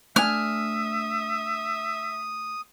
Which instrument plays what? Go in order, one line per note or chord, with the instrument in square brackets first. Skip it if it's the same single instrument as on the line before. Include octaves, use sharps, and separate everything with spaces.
[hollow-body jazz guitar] A3 D4 G#5 [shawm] E5 [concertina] D#6 [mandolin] F6